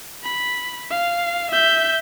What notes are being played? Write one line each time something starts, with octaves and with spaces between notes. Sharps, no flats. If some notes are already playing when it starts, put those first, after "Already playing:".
B5
F5
E5 G6